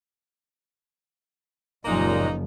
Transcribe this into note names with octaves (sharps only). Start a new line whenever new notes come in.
F#1 D#2 A#2 F3 G#3 A#3 D#4